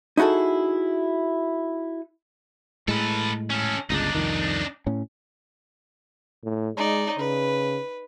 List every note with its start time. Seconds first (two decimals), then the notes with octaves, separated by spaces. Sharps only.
0.17 D#4 E4 F#4 G#4 A4
2.88 A2 G#3 A4 B4
3.50 C#4 A4
3.90 G1 C#2 G#3 D4 D#4
4.15 C2 F2 D#3
4.87 A2 C#4
6.44 A2
6.77 G#3 D#4 D5
7.18 C#3 B4